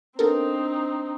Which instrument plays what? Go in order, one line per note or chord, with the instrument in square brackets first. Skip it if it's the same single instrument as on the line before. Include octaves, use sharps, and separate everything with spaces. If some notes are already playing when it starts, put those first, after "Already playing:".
[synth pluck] B3 A4 A#4 [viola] C4 D#4 [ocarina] D4